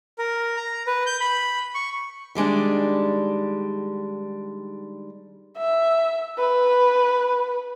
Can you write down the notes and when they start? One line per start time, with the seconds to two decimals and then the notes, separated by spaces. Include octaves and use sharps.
0.18 A#4
0.56 A#5
0.87 B4
1.06 G6
1.20 B5
1.75 C#6
2.35 D#3 G3 G#3 D4
5.58 E5
6.38 B4